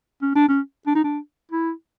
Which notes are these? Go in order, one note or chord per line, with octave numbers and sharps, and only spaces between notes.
C#4
D4
C#4
D4
D#4
D4
E4